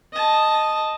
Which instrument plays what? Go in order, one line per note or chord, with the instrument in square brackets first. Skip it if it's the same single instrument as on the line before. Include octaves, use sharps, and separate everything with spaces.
[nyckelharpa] D#5 A5